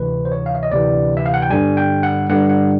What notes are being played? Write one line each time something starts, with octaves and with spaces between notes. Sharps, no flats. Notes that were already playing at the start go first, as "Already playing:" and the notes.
Already playing: D2 C3 E3 B4
C5
C#5
F5
E5
D#5
D2 C3 E3 D5
E5
F5
F#5
G5
G2 D3 G3 G#5
G5
F#5
G2 D3 G3 F#5
F#5